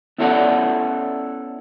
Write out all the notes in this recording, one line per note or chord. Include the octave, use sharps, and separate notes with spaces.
B3 C#4 E4 A4 D5 F#5